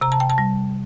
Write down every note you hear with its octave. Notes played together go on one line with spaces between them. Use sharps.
C3 A#5
A5
G5
A5
G3